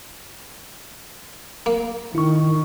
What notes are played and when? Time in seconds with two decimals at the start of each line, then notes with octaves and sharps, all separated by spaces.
1.66 A#3
2.15 D#3 E4 C#6